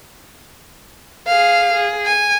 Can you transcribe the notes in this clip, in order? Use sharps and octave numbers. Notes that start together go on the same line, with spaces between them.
G#4 F5
G#4
G#5